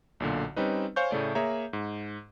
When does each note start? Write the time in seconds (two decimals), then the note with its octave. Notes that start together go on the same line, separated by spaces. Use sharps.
0.20 B1 A#2 D3
0.56 G3 C4 C#4 D#4 B4
0.96 C5 C#5 F5 G#5 C#6 G6
1.11 A2 C#3 A3 D5
1.35 A#3 G#4 C#5 E5 A#5
1.73 G#2